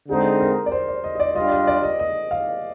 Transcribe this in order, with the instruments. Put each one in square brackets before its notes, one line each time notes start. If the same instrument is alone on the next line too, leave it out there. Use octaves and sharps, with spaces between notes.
[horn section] D3 G#3 C4 D#4 [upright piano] G#4
[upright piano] A#4
D5
C5
D5
D#5
D#5
D5
[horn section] G3 D4 F4 [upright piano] D#5
[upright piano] D#5
D5
D#5
D#5
F5